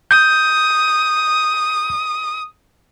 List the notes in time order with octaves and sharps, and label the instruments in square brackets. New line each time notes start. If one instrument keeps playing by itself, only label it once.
[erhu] D#6 [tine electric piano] G6